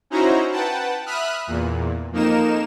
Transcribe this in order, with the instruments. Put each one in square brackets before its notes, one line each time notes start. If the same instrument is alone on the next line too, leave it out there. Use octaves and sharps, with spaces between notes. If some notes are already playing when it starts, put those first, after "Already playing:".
[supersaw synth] C#4 D#4 E4 F#4 C5 A#5
B4 F#5 G5 A5
E5 B5 D#6 F6 F#6
E2 A#2
F2 A#3 D#4 A#4 E7